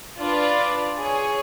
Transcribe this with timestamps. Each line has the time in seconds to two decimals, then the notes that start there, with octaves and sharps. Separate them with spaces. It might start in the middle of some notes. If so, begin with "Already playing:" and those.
0.18 D4 F4 B4 D5
0.97 G#4 C#5 G#5